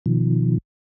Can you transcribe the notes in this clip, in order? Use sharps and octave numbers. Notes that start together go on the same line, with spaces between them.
B2 D#3 F3